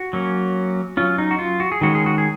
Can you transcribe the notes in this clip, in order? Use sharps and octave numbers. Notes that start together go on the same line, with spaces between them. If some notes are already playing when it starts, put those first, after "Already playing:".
Already playing: F#4
F#3 A#3 C#4
F#3 C#4 F4
D#4
F#4
F4
F#4
G#4
D#3 G#3 C#4 F#4
G#4
F#4
G#4